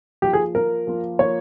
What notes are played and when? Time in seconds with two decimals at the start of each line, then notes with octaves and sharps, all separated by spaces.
0.22 F3 A#3 F4 G4
0.33 G#4
0.54 F3 A#3 F4 A#4
0.87 F3 A#3 F4
1.19 F3 A#3 F4 C#5